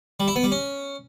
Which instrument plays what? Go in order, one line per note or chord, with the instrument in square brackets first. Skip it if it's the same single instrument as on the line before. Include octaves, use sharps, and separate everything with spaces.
[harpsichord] G3
E4
B3
G3
C#4